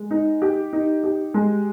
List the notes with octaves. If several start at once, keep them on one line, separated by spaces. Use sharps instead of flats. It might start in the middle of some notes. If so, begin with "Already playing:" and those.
Already playing: G#3
D#4
G4
D#4
G4
G#3